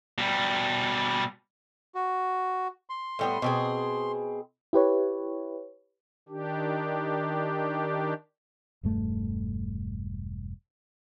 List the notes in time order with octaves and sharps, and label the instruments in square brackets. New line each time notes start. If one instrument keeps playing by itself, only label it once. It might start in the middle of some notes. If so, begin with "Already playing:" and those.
[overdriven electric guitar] B2 G3
[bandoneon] F#4
C6
[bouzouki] A2 G3 B3
B2 C4 G#4
[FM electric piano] E4 G4 B4 C#5
[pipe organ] D#3 D4 G4
[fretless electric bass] E1 G2 A3